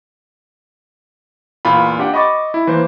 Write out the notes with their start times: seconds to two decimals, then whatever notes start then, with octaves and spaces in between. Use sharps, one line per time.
1.65 E2 A#2 F4 B5
1.99 D4 G4 F#5 G5
2.14 D#5 B5 C#6 D6 A6
2.54 E4
2.67 E3 A#3 C5